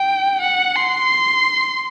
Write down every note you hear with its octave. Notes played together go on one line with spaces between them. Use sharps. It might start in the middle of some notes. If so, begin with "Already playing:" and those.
Already playing: G5
F#5
C6